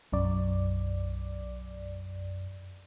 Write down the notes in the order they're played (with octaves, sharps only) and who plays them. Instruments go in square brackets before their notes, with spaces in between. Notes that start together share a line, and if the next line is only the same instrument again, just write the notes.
[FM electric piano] B1 F#2 D5